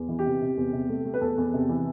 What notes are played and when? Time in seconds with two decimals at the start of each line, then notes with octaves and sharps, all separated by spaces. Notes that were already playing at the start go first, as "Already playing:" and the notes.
Already playing: E2
0.09 E3
0.19 G4
0.26 C3
0.42 C3
0.57 E2
0.73 C3
0.89 A3
1.05 A3
1.14 B4
1.21 E2 A4
1.38 E2
1.54 C3
1.69 E3